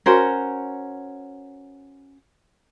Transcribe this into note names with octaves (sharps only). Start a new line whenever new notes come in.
C#4 F#4 A#4 C5